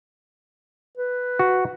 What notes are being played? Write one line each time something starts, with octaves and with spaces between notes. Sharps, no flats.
B4
F#4